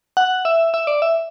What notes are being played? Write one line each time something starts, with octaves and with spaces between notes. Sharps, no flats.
F#5
E5
E5
D5
E5